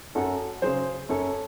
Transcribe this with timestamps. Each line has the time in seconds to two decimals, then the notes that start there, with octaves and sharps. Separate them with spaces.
0.15 F#2 F#4 A4
0.62 C#3 F#3 G#4 C5
1.09 F#2 A4 C#5